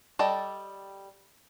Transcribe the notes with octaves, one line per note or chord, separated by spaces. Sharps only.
G3 A4 D5 D#5 G5